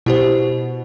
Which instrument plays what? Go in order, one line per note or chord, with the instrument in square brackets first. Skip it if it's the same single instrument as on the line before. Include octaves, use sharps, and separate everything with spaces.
[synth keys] B2 [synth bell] E4 G4 C5